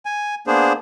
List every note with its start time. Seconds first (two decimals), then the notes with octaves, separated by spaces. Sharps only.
0.06 G#5
0.47 A#3 B3 D4 G#4 C5